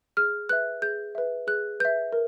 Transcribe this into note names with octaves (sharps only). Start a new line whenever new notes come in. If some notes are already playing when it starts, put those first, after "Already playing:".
G#4 F6
B4 E5 F#6
G#4 G6
B4 E5
G#4 F#6
B4 E5 G6
A#4